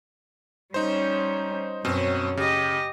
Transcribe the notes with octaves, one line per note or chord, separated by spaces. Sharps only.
G3 C#4 D#4 C5
F#2 B2 C4 C#4
C#3 G4 D#5